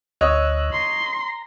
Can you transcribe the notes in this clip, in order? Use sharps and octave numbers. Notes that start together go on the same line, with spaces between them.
D2 C#5 D#5 E6 F#6
A#5 C6